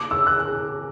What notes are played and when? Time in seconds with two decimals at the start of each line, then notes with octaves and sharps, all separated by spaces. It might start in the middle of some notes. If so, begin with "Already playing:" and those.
Already playing: D6
0.11 E6
0.27 F#6